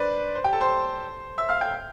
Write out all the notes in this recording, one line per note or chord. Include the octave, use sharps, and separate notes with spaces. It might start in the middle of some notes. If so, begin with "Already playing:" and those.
Already playing: D4 B4 C5 D5
C5
G4 G5
A4 A5
C5 C6
E5 E6
F5 F6
G5 G6